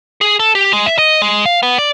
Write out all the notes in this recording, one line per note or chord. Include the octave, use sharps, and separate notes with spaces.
G#4
A4
G4
G#3
E5
D#5
G#3
F5
B3
D5